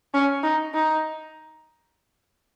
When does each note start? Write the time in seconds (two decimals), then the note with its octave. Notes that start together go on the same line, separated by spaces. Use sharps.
0.14 C#4
0.43 D#4
0.74 D#4